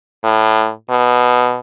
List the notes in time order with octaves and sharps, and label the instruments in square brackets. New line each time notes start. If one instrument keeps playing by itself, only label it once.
[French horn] A2
B2